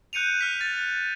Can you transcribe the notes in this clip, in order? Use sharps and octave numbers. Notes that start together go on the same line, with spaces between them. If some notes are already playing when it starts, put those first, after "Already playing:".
F#6 G6 C#7 D#7 F7
F6 B6
A6